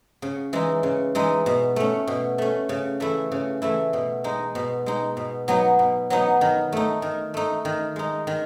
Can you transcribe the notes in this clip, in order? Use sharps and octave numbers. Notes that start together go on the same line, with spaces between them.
C#3
E3 G#3 D#4
C#3
E3 G#3 D#4
B2
A3 C#4
B2
A3 C#4
C#3
E3 A3 E4
C#3
E3 A3 E4
B2
G#3 D#4
B2
G#3 D#4
B2
F#3 B3 D#4
B2
F#3 B3 D#4
D#3
A3 D#4
D#3
A3 D#4
D#3
G#3 D#4
D#3